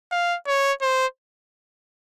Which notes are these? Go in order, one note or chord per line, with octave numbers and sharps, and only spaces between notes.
F5
C#5
C5